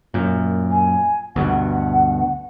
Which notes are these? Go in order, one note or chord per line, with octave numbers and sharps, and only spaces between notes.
F#2 A#2
G#5
D2 G2 B2 F#5